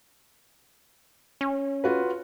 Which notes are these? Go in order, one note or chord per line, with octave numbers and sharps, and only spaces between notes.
C#4
F4 F#4 B4